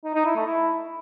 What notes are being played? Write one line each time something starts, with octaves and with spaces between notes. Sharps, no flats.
D#4
D#4
E4
A3
E4